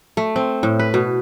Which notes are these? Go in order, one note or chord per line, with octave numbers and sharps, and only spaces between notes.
A3
C4
A2
B4
B2